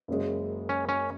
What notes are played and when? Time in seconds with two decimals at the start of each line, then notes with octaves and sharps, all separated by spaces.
0.08 F#1 F#2 C#3 G#3
0.69 C#4
0.89 C#4